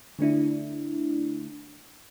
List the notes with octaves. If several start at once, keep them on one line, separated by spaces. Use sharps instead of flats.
D3 A3 D4 E4